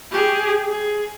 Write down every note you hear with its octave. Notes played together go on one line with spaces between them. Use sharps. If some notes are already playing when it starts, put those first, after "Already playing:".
G4 G#4
G#4